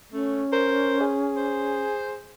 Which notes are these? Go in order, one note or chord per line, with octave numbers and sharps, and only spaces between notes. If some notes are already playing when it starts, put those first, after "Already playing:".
A3 C#4
A#4 C5
G#4
C5